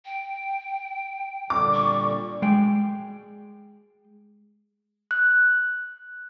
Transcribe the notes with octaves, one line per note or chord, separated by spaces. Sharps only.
G5
A#2 D3 G3 D6
C#6
G#3 G5
F#6